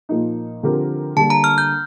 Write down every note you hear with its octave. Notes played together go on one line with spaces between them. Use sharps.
A#2 F3 A#3 D#4
D3 F3 C4 G4 A#4
D3 G3 A#3 D4 A5
A#5
F6
G6